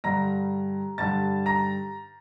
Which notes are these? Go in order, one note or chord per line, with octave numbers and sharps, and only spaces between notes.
G2 D3 G3 A#5 A#6
G2 D3 G3 A5 A6
A#5 A#6